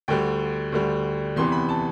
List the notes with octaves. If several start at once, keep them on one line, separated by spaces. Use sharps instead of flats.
D2 D3 G3 G5
D2 D3 G3
E2 C3 E3 B3 C6
B5
A5